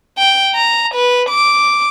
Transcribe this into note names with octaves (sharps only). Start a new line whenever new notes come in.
G5
A#5
B4
D6